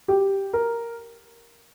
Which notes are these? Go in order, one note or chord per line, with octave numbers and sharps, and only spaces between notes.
G4
A#4